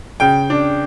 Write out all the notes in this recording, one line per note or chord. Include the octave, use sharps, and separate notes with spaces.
C#3 G5
D4